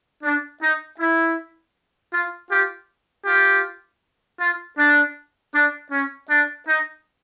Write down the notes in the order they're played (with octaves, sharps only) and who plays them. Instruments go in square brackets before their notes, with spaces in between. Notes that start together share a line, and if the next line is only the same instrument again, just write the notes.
[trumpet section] D4
D#4
E4
F4
F4 G4
F4 G4
F4
D4
D4
C#4
D4
D#4